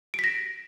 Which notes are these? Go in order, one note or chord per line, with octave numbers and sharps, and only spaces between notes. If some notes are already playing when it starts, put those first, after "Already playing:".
A#6 B6 D7